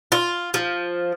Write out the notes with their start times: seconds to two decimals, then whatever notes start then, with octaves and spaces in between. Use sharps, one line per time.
0.12 F4
0.54 F3